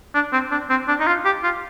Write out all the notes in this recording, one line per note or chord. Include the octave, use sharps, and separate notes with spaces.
D4
C4
D4
C4
D4
D#4
F4
G4
F4